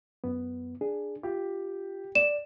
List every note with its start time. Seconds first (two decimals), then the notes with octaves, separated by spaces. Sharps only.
0.24 F#2 B3
0.81 D4 G#4
1.23 F4 G4
2.15 D5 E7